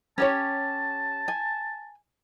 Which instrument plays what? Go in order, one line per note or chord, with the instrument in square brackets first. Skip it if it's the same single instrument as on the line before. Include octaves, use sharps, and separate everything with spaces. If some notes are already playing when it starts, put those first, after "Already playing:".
[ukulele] C#4 G4 C#5 [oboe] A5
[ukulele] G#5